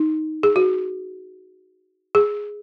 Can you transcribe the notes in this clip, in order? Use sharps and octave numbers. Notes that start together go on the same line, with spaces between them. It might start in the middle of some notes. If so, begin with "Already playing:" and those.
Already playing: D#4
G#4
F#4
G#4